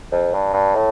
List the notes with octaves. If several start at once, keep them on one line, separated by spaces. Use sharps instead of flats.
F2
G2
G2
A2